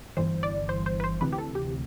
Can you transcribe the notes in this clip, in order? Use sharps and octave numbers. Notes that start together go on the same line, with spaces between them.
G1 G2 E3 C5
D5
C5
C5
B4
C5
D2 C3 E3 B4
G4
A4
G4